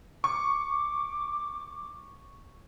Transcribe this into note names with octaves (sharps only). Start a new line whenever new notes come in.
C#6 D6